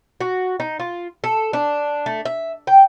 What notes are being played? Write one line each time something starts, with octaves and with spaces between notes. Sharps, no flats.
F#4
D#4
F4
A4
D4
A3
E5
G5